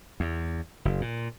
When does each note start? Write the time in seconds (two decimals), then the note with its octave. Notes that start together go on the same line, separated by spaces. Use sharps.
0.20 E2
0.85 F#1
1.01 A#2